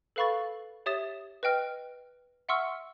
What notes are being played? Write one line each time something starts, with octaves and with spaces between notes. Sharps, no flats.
A4 B4 F5 B5 C#6 A6
G4 C#5 E5 D#6 A6 E7
B4 D#5 G5 F6
E5 F#5 C6 C#6 E6 F6